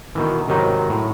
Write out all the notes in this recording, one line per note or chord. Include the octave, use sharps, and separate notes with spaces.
B2 D#3 E3
G#2 C3 D#3 F#3 D#4
A2